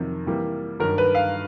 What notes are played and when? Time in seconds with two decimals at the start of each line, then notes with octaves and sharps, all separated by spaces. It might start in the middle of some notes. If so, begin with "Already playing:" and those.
Already playing: F2 C3 D#3 F#3
0.26 C3 E3 G3 A#3
0.80 G2 D#3 F#3 A#4
0.98 B4
1.15 F5